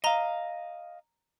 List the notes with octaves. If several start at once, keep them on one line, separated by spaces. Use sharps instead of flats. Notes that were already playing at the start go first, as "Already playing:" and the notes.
D#5 F5 A#5 G7